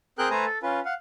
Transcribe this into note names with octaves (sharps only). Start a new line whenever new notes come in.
C4 G#4 A#4 G5 F#6 G6
A3 B4 C5 G#5 A#5
A4
C#4 F4 B4
F5 F#5